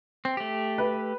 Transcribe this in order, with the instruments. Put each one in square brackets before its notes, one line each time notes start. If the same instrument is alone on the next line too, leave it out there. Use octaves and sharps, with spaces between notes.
[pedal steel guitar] C4
A3 G4
[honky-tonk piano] B4